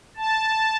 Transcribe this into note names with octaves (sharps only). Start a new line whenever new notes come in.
A5